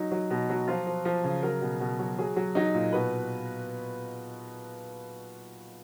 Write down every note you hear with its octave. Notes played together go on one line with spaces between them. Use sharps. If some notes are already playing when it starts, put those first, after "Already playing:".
Already playing: F#3 D#4
F#3
B2
F#3
F3 F4
F3
F3
C#3
F#3 A#4
B2
B2
F#3
F#3 G#4
F#3
F#3 D#4
A#2
B2 B4